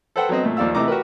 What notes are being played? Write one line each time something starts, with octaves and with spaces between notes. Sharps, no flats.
A4 B4 C5 F#5 G5
F#3 B3 C4 D#5
A#2 A3
D#2 F3 D5 F5 E6
C3 E3 A3 D#5 A#5 D6
F#4 G4 A#4 B4